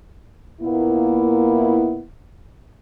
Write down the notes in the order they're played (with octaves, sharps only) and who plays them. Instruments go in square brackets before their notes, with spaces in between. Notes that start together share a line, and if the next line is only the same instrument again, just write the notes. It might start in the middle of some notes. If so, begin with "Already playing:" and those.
[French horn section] A#2 A#3 B3 E4